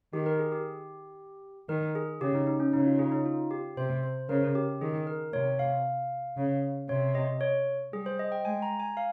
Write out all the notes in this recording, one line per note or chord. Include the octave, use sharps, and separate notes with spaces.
D#3 G4
A#4
G#4
G4
D#3 A#4
G#4
C#3 G4
D#4
D#4
C#4
C#3 D#4
F4
G#4
D#4
F4
G4
C3 C5
C5
C#3 A#4
G4
D#3 G#4
A#4
C3 C#5
F5
C#3
C3 C#5
D#5
C#5
G3 G#4
C5
D#5
G5
G#3 G#5
A#5
G#5
F5